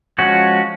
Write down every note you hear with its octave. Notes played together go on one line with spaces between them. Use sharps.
F3 G#3 C#4 F#4